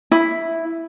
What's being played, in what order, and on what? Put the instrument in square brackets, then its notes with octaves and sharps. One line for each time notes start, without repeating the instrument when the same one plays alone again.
[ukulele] E4